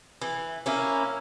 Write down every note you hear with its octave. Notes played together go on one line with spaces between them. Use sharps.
E3
A#3 C#4 E4